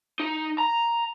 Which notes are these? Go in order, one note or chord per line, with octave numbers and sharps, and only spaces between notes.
D#4
A#5